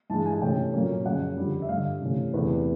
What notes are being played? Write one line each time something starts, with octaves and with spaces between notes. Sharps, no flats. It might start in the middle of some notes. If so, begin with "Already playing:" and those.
G2 E3 G#3 A5
G#5
C3 E3 A3 C#4 G5
A#2 F#3 A#3 C#4
F#2 C#3 F3 F#5
F2 D3 G3
E5
G2 D3 G3 F5
C3 E3 A3 C#4
E2 C3 E3 A3 C4 B4